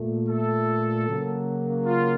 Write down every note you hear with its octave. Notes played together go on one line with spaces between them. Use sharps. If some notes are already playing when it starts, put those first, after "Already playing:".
Already playing: A#2 A3
A4
C#3 F#3 A#3
F4